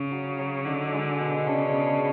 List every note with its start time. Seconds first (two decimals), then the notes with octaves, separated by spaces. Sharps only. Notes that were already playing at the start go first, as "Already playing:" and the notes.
Already playing: C#3
0.11 F#3
0.39 F#3
0.66 D3 D#4
0.93 G#3
1.20 B2
1.47 C#3 D4
1.73 B3